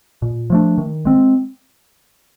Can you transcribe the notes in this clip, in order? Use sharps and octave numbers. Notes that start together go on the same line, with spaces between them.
A#2
F3 A3 D4
D#3
G#3 C4